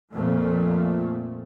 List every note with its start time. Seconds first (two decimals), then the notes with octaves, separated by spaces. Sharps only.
0.13 F2 A#2 F3 A3